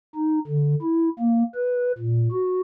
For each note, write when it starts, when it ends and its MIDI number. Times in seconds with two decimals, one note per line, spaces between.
0.15 0.39 63
0.47 0.75 50
0.82 1.09 64
1.19 1.43 58
1.55 1.92 71
1.98 2.28 46
2.32 2.61 66